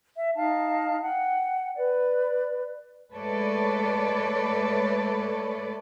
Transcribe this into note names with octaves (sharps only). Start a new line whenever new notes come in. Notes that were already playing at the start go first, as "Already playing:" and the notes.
E5
D#4 F5 A5
F#5 G5
B4 D5
G#3 A3 A4 B4 C#5 D5